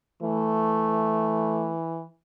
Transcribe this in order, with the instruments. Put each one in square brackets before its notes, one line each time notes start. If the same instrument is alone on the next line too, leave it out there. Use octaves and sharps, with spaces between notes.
[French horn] E3 [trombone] A3